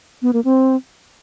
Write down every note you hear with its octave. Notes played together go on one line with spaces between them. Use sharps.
B3
A#3
C4